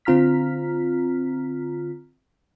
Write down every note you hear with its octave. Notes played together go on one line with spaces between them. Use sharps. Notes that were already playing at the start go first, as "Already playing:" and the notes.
D3 C4 F4 A#5 F6 B6